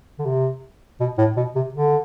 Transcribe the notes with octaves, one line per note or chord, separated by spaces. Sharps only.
D3
C3
B2
A2
B2
C3
D3